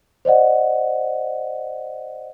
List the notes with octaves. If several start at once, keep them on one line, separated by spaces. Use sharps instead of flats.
C5 D5 D#5 F#5